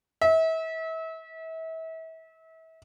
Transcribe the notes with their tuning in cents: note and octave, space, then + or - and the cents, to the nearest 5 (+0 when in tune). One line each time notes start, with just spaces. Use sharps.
E5 -35